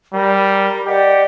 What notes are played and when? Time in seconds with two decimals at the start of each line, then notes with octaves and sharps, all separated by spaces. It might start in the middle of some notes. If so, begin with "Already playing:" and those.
0.14 G3 A#4 A#5 B5
0.86 G4 D5 D#5 F#5